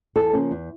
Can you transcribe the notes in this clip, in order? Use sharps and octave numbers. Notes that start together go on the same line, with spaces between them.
E2 A4
C#3 F3 A#3 C#4
E2